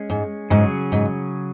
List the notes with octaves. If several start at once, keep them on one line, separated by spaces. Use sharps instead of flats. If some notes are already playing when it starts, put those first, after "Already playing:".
Already playing: G#3 C#4 G#4
G#2
G#2 C#3 F#3 C#4 G#4
G#2